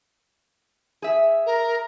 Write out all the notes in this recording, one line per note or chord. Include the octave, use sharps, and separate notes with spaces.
G#4 E5
A#4